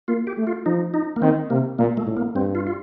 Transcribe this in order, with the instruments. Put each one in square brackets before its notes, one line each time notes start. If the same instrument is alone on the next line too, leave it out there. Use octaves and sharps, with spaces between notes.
[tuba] A#3 [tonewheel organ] F4
[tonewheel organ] G4
[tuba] A3
[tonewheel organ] F4
[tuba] F3 [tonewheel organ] D#4
[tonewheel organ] D#4
A#3
[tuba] D#3 [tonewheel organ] C4
[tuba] C3 [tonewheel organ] A#3
[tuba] A#2 [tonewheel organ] A#3
[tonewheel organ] A3
[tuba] A2
[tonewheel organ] A#3
[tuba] G2 [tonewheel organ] C4
[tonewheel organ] F4
F4